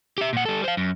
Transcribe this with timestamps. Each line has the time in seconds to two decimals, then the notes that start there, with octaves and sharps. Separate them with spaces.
0.18 G4 E5
0.33 A#2 F#5
0.45 G3 A4
0.64 C5 F5
0.77 F#2